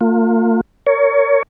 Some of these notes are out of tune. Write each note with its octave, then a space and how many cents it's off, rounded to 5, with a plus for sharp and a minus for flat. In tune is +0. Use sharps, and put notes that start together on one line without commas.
A#3 -45 F4 +25
A#4 -20 C#5 +25